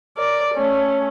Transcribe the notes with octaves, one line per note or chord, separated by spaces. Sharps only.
A#4 D5
A3 C#4